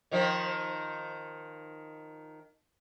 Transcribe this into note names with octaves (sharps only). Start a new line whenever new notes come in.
D#3 F3 D#4